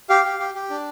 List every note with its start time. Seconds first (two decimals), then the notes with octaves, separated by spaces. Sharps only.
0.09 G4 F5
0.25 G4
0.39 G4
0.55 G4
0.70 D4